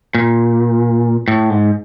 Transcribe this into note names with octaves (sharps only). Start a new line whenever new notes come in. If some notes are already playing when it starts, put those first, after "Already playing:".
A#2
A2
G#2